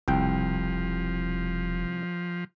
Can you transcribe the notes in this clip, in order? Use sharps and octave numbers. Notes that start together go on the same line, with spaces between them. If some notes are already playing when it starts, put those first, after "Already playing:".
E1 C2 F3 G5